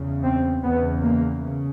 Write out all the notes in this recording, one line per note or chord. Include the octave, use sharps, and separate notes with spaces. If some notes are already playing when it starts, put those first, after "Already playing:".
Already playing: E2 C#3
C4
E2 C#3 B3
A#3
C#3